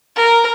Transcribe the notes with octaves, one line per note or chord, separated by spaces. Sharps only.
A#4